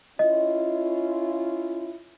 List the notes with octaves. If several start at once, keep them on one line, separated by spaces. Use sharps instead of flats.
C#4 E4 F4 D#5